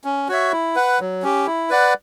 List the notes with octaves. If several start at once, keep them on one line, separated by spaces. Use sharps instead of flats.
C#4
F#4 C#5 E5
E4
B4 F#5
F#3
C#4 G4
E4
B4 D5 F#5